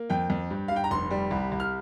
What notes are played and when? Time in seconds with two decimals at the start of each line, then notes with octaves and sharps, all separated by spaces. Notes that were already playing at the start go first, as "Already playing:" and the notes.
Already playing: A#3
0.10 F2 G5
0.30 F2
0.51 G2
0.68 F5
0.71 G2 G5
0.84 A#5
0.91 F1 C6
1.11 G3
1.31 C2
1.52 C2
1.60 F6